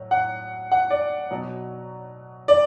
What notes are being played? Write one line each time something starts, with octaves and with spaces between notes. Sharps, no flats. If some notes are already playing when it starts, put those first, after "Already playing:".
Already playing: A2 F#3
F#5
F#5
D5
B2 F#3
D5